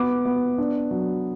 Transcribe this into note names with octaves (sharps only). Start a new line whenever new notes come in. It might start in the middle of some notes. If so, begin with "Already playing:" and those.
Already playing: B3 D6
B3
D4
F#3